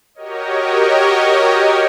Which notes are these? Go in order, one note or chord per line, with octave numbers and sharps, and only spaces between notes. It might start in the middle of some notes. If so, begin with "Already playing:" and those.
F#4 G4 A#4 C#5 D#5